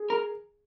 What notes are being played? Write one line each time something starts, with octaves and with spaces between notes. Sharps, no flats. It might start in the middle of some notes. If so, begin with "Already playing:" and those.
Already playing: G#4
A#4